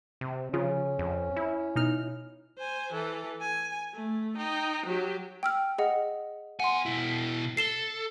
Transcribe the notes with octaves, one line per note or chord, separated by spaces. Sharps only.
C3
C#3 F3 C#4 F4 G#4
F2
E4
B2 D#4 F6
C5 G#5
E3 A4
G#5
A3
D#4 G5
F#3 G4
G5 E6 F6
G#4 D#5 F#5
B3 F#5 G#5 C6
B2 E4
A4 C7 E7 G7